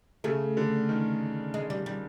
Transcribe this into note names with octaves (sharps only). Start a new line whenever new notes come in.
C#3 A3
D3
D#3
G#3
G3
G3